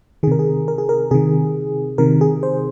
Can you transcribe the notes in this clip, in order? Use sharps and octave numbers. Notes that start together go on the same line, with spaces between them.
C3 D#3 G#4 A#4
G#4
A#4
G#4
A#4
C3 D#3 G#4
C3 D#3 A#4
G#4
C5